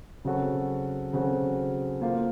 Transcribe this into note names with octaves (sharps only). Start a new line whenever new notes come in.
C#3 F#3 C4 F#4 A4
C#3 F#3 C4 F#4 A4
A#3 F4 A4 C5